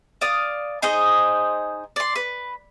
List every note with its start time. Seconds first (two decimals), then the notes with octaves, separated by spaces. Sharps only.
0.21 D5 F5 D#6
0.82 D#4 G#4 C5 D#5
1.96 D5 C6
2.16 B4